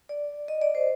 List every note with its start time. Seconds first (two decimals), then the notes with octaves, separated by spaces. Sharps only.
0.09 D5
0.48 D#5
0.62 D5
0.75 C5